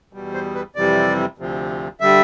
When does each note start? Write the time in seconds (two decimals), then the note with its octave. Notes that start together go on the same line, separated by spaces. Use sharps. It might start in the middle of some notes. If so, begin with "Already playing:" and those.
0.13 E2 B2 G3
0.34 C5
0.55 B4
0.75 F2 C3 E3 G3 D5
1.38 D2 C3 F3
2.00 D3 G3 E5